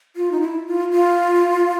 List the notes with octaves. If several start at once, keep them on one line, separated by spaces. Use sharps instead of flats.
F4
D#4
E4
F4
F4